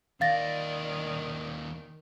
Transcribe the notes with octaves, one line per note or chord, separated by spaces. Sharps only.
D#2 D#3 D5 F5 A6 A#6